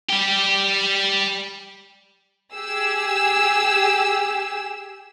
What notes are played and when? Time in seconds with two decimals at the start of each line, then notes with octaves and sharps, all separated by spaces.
0.10 G3 G4
2.54 G4 G#4 E6